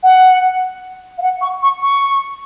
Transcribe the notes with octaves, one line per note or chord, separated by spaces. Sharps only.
F#5
F5
F#5
C#6
C#6
C#6